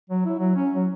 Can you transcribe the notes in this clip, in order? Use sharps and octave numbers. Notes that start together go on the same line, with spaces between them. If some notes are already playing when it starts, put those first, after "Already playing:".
F#3
E4
F#3
C#4
F#3